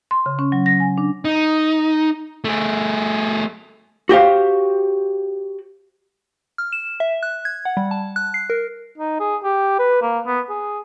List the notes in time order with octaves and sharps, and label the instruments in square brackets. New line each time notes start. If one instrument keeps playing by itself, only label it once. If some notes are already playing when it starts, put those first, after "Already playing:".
[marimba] C6
C#3
C#4
F#3
A#6
G#5
D4
[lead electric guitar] D#4
A3 G#4
[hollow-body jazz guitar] F#4 G4 C5 F5
[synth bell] F6
E7
E5
F#6
G#6
F#5
G3
A5
F#6
C7
A#4
[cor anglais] D#4
G#4
G4
B4
A#3
B3
G#4